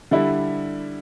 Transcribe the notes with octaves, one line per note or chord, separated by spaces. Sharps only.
D3 G3 E4